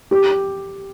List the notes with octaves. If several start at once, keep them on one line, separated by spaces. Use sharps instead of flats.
G4